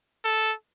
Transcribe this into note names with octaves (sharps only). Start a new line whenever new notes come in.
A4